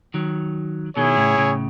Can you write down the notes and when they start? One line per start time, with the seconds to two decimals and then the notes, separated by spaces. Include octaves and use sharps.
0.14 D#3 F#3
0.97 B2 D#3 E4 G#4 C#5
1.17 A2 C#3
1.38 A2 C#3